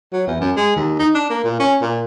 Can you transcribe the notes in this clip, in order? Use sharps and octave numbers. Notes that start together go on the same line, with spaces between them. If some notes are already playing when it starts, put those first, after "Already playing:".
F#3
E2
F#2
G#3
D#2
D#4
D4
A#3
A#2
C#4
A#2